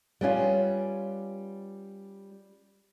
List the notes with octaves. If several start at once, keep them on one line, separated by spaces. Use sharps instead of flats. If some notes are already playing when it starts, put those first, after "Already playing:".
G3 B3 C#4 F4